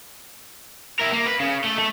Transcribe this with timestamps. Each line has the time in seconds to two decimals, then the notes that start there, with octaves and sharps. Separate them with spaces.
1.00 E4 A#4
1.13 A#3
1.26 B4
1.40 C#3
1.64 A3
1.79 A3